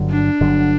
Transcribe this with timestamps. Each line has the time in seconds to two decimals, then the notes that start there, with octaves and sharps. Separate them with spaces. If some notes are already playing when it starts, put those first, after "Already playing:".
Already playing: G1 G2 D3 F#3
0.10 D4
0.41 G1 G2 D3 F#3